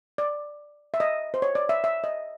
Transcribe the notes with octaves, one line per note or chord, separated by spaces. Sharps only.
D5
E5
D#5
C5
C#5
D5
E5
E5
D#5